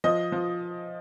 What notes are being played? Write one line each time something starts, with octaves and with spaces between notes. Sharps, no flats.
F3 D#5
F3